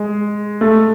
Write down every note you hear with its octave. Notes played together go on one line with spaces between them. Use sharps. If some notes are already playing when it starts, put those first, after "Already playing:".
Already playing: G#3
A3